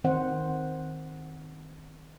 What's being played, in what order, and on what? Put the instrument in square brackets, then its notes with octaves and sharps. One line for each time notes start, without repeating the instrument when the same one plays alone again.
[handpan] D#3 C4 C5 F#5